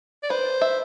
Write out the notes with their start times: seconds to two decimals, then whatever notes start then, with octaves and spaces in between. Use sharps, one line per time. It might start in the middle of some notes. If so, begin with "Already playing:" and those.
0.23 D5
0.30 B4 C5
0.61 E5